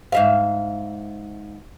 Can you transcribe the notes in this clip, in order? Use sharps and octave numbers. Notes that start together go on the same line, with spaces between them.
G#2 E5 F5